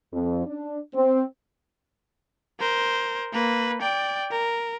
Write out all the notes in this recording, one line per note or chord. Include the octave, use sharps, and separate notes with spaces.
F2
D4
C4
A#4 C5
A#3 B4
D5 G5
A#4